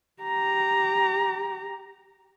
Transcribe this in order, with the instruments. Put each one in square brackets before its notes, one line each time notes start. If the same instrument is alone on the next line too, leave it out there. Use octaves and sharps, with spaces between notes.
[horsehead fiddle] G4 A#5